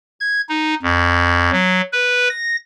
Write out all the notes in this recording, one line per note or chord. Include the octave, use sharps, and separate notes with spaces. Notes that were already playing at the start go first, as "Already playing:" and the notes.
G#6
D#4
F2
F#3
B4
A#6